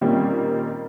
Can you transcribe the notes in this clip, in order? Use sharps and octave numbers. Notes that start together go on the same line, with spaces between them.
A#2 D#3 G3 A#3 C4 C#4